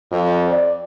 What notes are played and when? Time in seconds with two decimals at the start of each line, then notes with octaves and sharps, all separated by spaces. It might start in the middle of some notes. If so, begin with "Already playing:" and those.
0.12 F2
0.50 D5